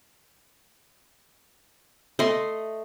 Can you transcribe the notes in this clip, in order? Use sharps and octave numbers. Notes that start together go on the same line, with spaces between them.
A3 D#5 C6